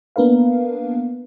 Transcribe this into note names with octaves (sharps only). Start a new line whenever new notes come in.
A#3 B3 D4 A#4 B4 F5